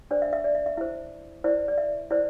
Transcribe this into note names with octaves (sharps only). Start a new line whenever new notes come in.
D4 C5 D5
E5
E5
D5
E5
E5
E4 C5 E5
E4 C5 D5
D5
E5
E4 C5 D5